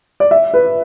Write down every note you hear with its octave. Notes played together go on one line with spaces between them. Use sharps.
D5
E5
B4